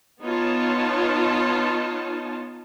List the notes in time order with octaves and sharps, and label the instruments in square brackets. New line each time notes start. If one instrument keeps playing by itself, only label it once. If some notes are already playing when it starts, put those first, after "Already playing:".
[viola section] B3 D#4 F4 C#5 A5